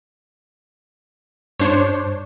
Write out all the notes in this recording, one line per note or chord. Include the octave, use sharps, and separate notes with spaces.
G2 D4 C5 C#5